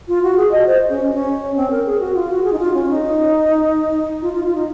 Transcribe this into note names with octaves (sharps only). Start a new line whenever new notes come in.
F4
F#4
G#4
D#5
C5
C#4
C#4
C4
A#4
G#4
F#4
F4
F#4
G#4
D#4
F4
C#4
D#4
F4
F4
F4
D#4